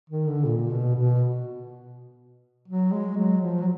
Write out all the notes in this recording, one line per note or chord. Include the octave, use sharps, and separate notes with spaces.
D#3
D3
A#2
B2
B2
F#3
G#3
F#3
F3
F#3